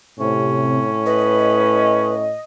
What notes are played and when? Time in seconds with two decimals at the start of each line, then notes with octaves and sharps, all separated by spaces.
0.20 A2 C3 C#4
1.06 B4 D#5